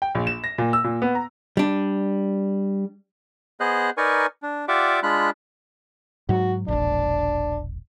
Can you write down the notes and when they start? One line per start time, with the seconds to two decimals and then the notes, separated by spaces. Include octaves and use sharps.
0.02 G5
0.15 A#1
0.27 E7
0.44 A#6
0.58 A#2
0.73 E6
0.84 A#2
1.02 B3
1.15 A#5
1.57 G3 D4
3.60 B3 G#4 C5 D#5 F#6
3.97 D#4 A#4 B4 D5 G#5 C#6
4.43 D4
4.68 F4 G4 D5 E5 F#5 D6
5.03 G#3 D4 F4 B5 F#6
6.29 G#2 F#3 F#4
6.68 E1 A#1 D4